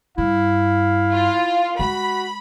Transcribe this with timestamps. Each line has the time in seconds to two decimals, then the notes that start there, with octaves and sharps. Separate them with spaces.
0.18 G2 E4 F5
1.13 F4
1.79 G#3 F#4 B5